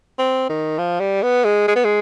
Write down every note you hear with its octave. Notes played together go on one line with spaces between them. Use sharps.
C4
D#3
F3
G3
B3
G#3
G#3
B3
G#3